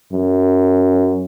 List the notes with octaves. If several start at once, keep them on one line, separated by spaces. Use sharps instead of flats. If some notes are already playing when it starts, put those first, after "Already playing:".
F#2